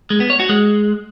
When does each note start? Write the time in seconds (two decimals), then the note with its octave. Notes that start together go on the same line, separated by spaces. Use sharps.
0.10 G#3
0.20 B3
0.30 C#5
0.40 F#4
0.49 G#3